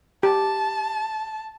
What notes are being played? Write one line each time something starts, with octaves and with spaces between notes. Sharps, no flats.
G4 A5